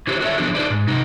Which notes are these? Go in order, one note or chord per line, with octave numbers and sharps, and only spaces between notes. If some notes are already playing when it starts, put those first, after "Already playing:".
D3 E4 G4 G#4 C5 C#5
F#4 A4 B4 C#5 E5
F3 F#3 B3 D4 G#4 A#4
D4 D#4 G#4 B4 C5 D5
G#2
C3 D#4